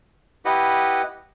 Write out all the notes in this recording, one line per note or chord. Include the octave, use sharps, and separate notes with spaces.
E4 G4 B4 D#5 F#5